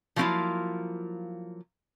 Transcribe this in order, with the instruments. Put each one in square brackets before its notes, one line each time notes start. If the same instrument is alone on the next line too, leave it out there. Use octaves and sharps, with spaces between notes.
[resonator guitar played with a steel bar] F3 F#3 A#3 C4 E4 F4